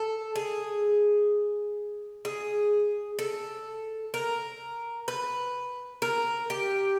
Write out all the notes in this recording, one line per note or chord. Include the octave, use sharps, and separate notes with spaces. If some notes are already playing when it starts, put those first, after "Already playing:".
Already playing: A4
G#4
G#4
A4
A#4
B4
A#4
G4